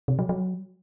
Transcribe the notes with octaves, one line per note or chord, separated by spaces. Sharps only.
C3
F#3
F#3